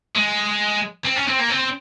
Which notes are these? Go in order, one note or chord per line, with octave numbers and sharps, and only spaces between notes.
G#3
C4
C#4
C4
A#3
C4